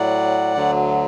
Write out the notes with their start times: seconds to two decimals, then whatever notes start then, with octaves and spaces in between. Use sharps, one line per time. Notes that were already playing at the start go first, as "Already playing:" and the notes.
Already playing: A2 F#3 D5 F#5
0.55 D2 D3 F#3